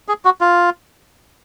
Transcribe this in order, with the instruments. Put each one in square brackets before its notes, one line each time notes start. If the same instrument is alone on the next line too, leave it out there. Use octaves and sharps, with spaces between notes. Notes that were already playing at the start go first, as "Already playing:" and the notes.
[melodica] G#4
F#4
F4